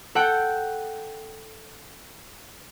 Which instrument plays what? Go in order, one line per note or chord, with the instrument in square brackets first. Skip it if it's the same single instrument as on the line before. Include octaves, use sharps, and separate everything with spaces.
[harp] A4 F#5 G5